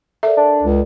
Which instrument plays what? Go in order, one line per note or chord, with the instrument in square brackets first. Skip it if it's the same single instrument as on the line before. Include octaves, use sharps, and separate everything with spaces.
[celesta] A4 A#4 D5 [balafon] E5
[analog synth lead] D4
[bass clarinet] C#2